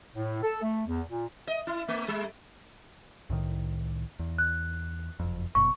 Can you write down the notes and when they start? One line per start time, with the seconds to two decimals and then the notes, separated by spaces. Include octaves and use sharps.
0.16 A2
0.43 A4
0.62 A3
0.87 E2
1.09 A#2
1.47 D#5
1.67 E4
1.88 A3
2.08 G3
3.30 C2 A2 D#3
4.19 E2
4.38 F#6
5.20 F#1 F2
5.55 G1 F#2 B2 C#6